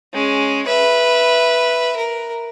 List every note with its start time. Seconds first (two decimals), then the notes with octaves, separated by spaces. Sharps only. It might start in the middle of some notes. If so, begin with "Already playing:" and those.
0.13 G#3 C#4
0.67 B4 E5
1.97 A#4